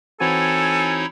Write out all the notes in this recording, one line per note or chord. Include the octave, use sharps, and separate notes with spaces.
E3 C4 D#4 E4 F#4 A4 C#5 G#5